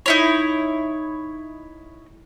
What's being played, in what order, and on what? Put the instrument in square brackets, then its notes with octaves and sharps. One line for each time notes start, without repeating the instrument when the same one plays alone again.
[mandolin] D#4 E4 C#5